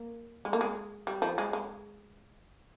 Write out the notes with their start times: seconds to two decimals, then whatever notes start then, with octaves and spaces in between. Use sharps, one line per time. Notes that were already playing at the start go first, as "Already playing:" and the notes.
Already playing: A#3
0.45 G#3
0.53 A#3
0.61 G#3
1.07 G3
1.22 F3
1.38 G#3
1.53 G#3